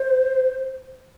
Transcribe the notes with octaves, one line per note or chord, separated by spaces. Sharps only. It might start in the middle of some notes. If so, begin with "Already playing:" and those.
Already playing: C5